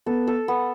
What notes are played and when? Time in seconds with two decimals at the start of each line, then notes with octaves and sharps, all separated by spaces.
0.06 B3 A4
0.27 A4
0.48 B3